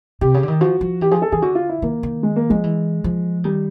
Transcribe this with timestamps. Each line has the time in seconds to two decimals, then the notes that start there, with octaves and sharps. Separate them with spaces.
0.21 C3 G4
0.34 C#3
0.43 D3
0.48 D#3
0.61 F3 F#4
0.81 F3
1.01 E3 G4
1.11 F3 G#4
1.22 A4
1.32 E3 G#4
1.42 D3 F#4
1.55 F4
1.69 E4
1.82 D#3 A#3
2.03 D#3
2.23 G#3
2.36 A#3
2.50 F3 G#3
2.64 E3
3.04 F3
3.44 D#3 G3